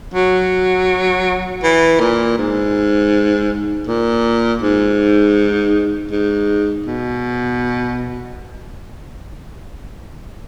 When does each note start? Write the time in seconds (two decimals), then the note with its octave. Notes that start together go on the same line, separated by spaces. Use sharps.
0.14 F#3
1.63 E3
2.00 A#2
2.38 G#2
3.87 A#2
4.62 G#2
6.11 G#2
6.86 B2